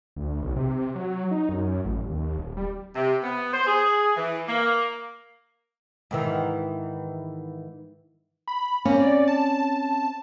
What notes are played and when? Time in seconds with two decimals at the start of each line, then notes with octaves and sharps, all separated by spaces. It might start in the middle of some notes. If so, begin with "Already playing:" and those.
0.16 D2
0.43 B1
0.56 C3
0.95 F#3
1.31 D#4
1.49 F#2
1.72 F#2
1.85 A1
2.10 D#2
2.38 D#1
2.57 G3
2.96 C3
3.23 B3
3.53 C5
3.67 G#4
4.16 E3
4.48 A#3
6.11 G#2 D#3 E3
8.48 B5
8.85 A#3 C4 C#4
9.00 D5
9.28 A5
9.53 A5